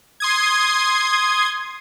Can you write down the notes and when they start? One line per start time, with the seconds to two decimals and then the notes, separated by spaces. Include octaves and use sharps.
0.20 C6 D#6 G#6